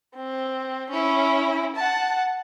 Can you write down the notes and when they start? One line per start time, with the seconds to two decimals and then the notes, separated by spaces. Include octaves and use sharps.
0.15 C4
0.90 C#4 E4
1.76 F#5 A5